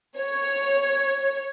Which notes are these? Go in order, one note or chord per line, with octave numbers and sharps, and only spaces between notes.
C#5